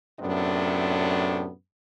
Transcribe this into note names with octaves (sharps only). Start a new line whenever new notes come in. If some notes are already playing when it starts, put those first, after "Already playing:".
F#2 A2 C3 A3 B3 D4